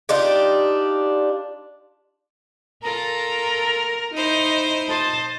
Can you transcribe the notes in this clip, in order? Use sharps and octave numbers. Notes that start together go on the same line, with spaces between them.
D4 D#4 F4 G4
F4 A4 A#4 A#5
D#4 E4 C5
C5 D#5 A5